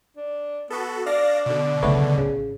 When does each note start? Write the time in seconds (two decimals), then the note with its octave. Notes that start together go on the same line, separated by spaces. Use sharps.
0.17 D4
0.70 B3 F#4 A4
1.06 D4 D5 F5 A#6
1.46 B2 D3
1.82 B1 C#3 A3 B3 C#5
2.17 A1 C#3